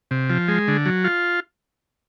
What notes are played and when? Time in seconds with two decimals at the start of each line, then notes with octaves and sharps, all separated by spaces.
0.11 C3
0.30 F3
0.48 G#3
0.68 D3
0.86 F#3
1.04 F4